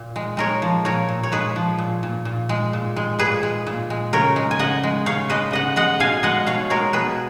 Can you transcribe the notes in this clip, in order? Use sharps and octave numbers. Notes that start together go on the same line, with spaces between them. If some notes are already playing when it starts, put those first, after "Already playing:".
Already playing: A#2
G#3
G#3 A#4 C#5
F3
A#2 A#4 C#5
A#2
C#5
G#3 G#4 B4
F3
A#2
A#2
A#2
G#3
A#2
G#3
A#2 G#4 B4
G#3
A#2
G#3
C#3 A#4 C#5
G#3
G#5
C#3 D#5 F#5
G#3
C#3 C#5 F5
G#3 B4 D#5
C#3 D#5 F#5
G#3 D#5 F#5
B2 F5 G#5
G#3 D#5 F#5
B2 C#5 F5
G#3 A#4 C#5
B2 G#4 B4